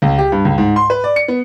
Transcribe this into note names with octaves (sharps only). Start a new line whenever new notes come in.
C#2
G4
G2
C#2
G#2
C6
B4
D5
C#7
B3